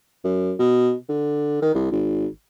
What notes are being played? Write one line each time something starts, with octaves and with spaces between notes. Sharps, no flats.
F#2
B2
D3
D#3
C2
G#1